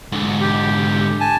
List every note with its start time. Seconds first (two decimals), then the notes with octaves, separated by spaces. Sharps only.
0.12 G#2 D3
0.41 G4
1.20 G#5 A5